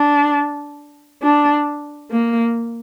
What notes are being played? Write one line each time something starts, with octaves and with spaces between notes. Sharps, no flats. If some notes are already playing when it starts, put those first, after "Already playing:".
Already playing: D4
D4
A#3